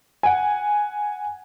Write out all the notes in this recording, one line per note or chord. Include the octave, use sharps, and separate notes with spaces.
F#5 G#5